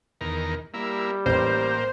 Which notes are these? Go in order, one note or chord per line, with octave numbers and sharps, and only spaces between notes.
E2 D#3 A#4
G3 A#3 E4
A1 A#3 C5